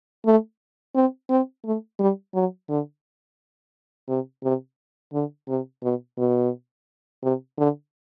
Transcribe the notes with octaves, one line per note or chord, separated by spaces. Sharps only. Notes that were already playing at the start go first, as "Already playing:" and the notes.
A3
C4
C4
A3
G3
F#3
D3
C3
C3
D3
C3
B2
B2
C3
D3